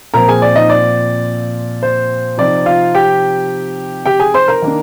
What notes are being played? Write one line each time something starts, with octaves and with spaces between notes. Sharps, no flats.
A#2 F3 C4 A#4 A#5
G#4 G#5
D5
D#4 D#5
D5
C5
C3 F3 C4 D#4 D5
F4 F5
G4 G5
G4 G5
G#4 G#5
C5 C6
A#4 A#5
D#3 A#3 D4